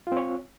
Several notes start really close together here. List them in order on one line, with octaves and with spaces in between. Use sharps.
F4 C4 C#5